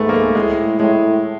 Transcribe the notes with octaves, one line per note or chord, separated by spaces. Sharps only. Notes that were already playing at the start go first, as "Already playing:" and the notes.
Already playing: G#2 A3 B3
A#3
A3
A2 G#3
A2 G#3